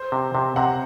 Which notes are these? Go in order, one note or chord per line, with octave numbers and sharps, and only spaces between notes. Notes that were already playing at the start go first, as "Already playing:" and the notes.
Already playing: C5
C3
C3
C3 F#5 A#5